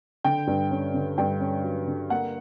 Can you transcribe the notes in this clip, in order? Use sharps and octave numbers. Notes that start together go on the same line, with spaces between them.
D3 G5
G2
C#4
D3
G2 G5
C#4
F#3
D3
A#3 F#5